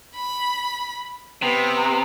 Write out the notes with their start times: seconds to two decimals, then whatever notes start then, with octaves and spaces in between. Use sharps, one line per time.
0.15 B5
1.42 C3 B3